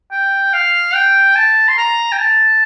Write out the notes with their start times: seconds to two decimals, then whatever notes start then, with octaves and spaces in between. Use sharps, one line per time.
0.12 G5
0.53 F5
0.94 G5
1.36 A5
1.68 C6
1.77 A#5
2.12 G5
2.18 A5